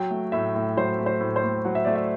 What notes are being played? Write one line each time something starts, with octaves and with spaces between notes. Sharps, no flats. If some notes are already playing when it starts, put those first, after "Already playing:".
Already playing: F#3 G5
A3
A2 E5
A2
F#3 C5
A3
C5
A2
C5
A2
F#3 F#5
E5
A3 D5
E5